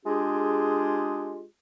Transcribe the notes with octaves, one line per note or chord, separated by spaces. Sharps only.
G#3 D4 F4 G4 G#4